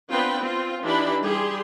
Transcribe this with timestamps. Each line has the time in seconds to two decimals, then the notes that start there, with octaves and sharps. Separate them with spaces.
0.11 B3 C4 D4 F4 B4 G5
0.40 C4 F4
0.84 E3 D4 D#4 G4 B5
1.22 G3 G4 G#4 C6